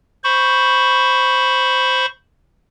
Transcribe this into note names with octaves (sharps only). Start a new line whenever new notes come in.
C5 B5 C#6